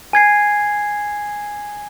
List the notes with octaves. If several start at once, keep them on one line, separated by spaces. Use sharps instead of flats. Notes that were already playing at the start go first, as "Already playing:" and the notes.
G#5 G#6 C7